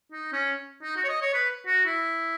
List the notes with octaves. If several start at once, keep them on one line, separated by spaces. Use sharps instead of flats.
D#4
C#4
D#4
F#4
C#5
D#5
C#5
B4
F#4
E4